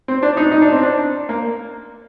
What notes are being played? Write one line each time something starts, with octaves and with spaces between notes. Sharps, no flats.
C4
D4
D#4
D#4
D4
C4
D4
A#3